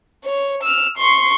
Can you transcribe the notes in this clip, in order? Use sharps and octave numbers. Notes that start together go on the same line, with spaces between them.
C#5
E6 F6
C6 C#6